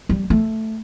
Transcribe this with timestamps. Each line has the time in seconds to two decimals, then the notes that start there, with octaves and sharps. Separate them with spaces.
0.09 G3
0.30 A3